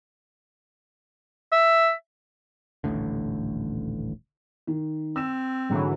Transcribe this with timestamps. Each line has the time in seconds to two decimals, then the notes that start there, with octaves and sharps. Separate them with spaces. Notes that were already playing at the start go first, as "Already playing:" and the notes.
1.52 E5
2.84 D#1 A1 A2 D3
4.67 D#3
5.16 C4 E6 E7
5.69 G#2 D3 E3 F#3 G#3